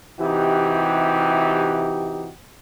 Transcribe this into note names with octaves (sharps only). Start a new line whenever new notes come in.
C3 E3 D#4 F#4 G4